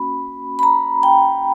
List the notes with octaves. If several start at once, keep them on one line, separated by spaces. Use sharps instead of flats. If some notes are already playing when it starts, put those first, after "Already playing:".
Already playing: A#3 C#4 F#4 B5
B5
A#5
G5